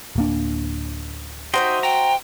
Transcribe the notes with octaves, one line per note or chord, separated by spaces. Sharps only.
D1 A#3 D4
D#4 F#4 C5 E5 G5 C6
G5 A#5